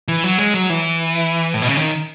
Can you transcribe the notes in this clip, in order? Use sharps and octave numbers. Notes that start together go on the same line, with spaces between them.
E3
F#3
G#3
F#3
E3
A2
B2
C#3
D#3